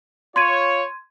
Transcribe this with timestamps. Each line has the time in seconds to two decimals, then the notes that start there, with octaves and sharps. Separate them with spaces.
0.36 F4 C#5 C6 G#6 D#7